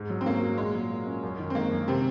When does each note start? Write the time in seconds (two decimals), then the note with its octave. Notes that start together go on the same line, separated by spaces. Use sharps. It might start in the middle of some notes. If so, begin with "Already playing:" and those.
Already playing: G#2
0.10 F#3
0.21 C4
0.26 A#3 C#4
0.42 F#4
0.58 A#2 G#3
0.74 F#3
0.91 A#3
1.06 C#4
1.23 F#2
1.39 D#3
1.50 C4
1.55 G#3 A#3
1.71 F#2
1.88 C3 C4